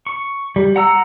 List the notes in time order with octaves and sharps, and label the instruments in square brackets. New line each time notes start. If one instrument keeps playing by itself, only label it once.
[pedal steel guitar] C#6
G3
F#5 A#5 E6